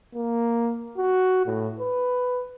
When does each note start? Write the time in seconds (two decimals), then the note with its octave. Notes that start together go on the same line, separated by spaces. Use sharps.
0.15 A#3
0.98 F#4
1.46 A2
1.79 B4